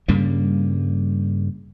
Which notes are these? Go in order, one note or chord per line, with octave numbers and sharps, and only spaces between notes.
G2 C#3 G3 A#3